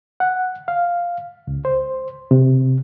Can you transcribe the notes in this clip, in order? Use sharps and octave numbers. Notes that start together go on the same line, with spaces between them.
F#5
F5
C#2
C5
C3